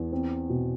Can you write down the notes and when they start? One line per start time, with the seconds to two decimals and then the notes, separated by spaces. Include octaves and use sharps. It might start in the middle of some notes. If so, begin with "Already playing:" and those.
Already playing: E2
0.12 C4
0.49 B2